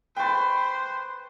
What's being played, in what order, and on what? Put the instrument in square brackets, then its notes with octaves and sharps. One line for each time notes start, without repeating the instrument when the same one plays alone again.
[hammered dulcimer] B4 A5 [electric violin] C5 [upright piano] G5 C#6